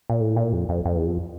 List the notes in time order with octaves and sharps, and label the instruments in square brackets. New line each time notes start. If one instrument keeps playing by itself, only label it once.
[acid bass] A#2
A2
A#2
F2
F2
F2
E2
F2